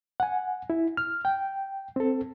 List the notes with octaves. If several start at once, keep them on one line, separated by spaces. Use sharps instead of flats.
F#5 G#5
E4
F6
G5
C4 A4